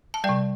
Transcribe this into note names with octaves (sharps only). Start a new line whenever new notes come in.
A5
G3 D5 G5
C3